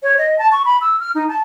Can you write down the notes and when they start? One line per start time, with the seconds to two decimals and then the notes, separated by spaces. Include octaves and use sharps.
0.03 C#5
0.18 D#5
0.39 A5
0.52 C#6
0.65 B5
0.81 E6
1.00 F6
1.15 D#4
1.29 A5